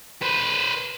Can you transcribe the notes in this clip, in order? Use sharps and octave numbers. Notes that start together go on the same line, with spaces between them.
B4 C5